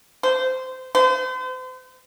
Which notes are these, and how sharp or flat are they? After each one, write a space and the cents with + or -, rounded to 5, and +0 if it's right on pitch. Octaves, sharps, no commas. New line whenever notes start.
C5 -20
C5 -40